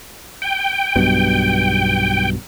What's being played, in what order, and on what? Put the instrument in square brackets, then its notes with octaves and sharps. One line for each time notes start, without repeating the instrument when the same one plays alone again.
[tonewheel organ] G5
[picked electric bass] B1 G2 B2